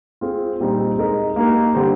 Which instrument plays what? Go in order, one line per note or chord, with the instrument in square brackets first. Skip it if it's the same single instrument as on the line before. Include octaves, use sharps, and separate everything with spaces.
[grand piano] C4 F4 G#4
A#2 G3 C4 D#4
G#3 D#4 A#4 D#5
A#3 D#4 G4 A#4
D3 G3 C4 G4 C5